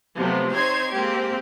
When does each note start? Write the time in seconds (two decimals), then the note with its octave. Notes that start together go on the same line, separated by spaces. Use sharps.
0.17 C3 F3 F#3 A3 B3
0.52 C4 D#4 C5 C#5 C6 G#6
0.93 G#3 A#3 C4 G4